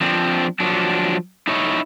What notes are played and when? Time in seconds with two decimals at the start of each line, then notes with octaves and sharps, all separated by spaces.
0.01 F3 C4 D4
0.60 F3 F#3 D4
1.47 D#4 E4 C#5